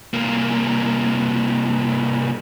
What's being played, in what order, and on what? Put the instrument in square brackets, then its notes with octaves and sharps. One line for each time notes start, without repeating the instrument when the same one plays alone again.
[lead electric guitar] C2 A#3